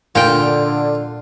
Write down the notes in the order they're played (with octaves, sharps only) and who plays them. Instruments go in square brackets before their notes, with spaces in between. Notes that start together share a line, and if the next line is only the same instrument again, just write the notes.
[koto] A#2 G5 [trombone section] D3 [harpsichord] F4